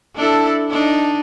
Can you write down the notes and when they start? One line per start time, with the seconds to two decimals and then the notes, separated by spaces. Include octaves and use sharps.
0.16 D4 E4 A4
0.71 D4 D#4